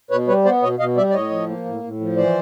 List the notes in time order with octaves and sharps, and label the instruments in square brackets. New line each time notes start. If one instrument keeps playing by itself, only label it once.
[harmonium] B2 B4 C#5
G3 B4 C#5
B3 C5 D5
B2 C#5 D#5
B2 D#5 F5
G3 D5 E5
D5
A2 C#5 D#5
F3
A#3
A2
A2
F3
E3 C5 D5